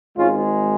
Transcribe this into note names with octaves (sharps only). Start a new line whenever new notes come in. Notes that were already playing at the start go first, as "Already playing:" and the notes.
G#1 G#2 G#3 C#4 F4